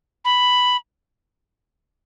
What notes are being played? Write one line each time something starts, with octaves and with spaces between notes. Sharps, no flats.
B5